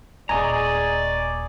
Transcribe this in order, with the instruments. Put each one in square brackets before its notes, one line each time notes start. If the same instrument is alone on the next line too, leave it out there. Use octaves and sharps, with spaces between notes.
[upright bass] D#1 [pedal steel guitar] G#4 D#5 A#5 [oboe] D5 [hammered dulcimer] G#5 C#6